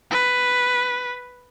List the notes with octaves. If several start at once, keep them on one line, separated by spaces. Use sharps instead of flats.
B4